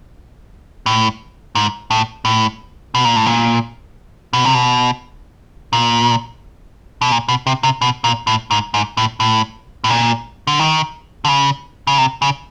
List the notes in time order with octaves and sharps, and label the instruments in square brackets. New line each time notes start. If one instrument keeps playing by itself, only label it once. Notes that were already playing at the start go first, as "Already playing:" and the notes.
[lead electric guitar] A2
G#2
A2
A2
B2
A#2
A2
A#2
B2
C3
B2
A#2
B2
A#2
B2
C3
C3
B2
A#2
A2
G#2
G#2
A2
A2
A2
A#2
D3
D#3
D3
C#3
C#3
C3
C#3